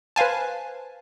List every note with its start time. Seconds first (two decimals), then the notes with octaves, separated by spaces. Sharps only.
0.16 B4 C5 F5 G#5 A5